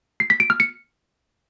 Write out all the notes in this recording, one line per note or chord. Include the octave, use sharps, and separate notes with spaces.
C7
B6
D7
F6
C#7